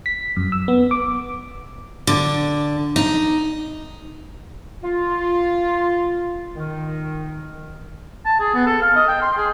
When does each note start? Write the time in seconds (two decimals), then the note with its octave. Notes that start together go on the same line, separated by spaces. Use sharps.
0.06 B6
0.36 F#2
0.52 E6
0.68 B3
0.91 D6
2.07 D3
2.96 D#4
4.84 F4
6.56 D#3
8.25 A5
8.40 G#4
8.54 B3
8.67 A4
8.82 F5
8.96 D#5
9.08 G5
9.22 C6
9.37 G#4